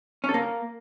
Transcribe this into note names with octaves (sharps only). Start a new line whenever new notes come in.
C#4
A4
A#3